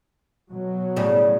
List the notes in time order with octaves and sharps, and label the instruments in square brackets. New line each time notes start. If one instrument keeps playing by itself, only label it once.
[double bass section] B2 F#3
[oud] A2 C#3 G3